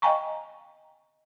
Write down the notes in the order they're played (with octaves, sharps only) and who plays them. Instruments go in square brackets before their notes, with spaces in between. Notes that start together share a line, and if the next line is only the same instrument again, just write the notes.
[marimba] D#5 F5 G5 G#5 A#5 C#6